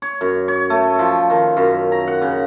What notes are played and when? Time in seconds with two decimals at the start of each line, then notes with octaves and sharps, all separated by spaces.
0.02 C#5
0.21 F#2
0.48 C#5
0.70 A3
0.99 F3
1.30 D#3
1.57 F#2
1.92 A#5
2.08 F#5
2.22 C#3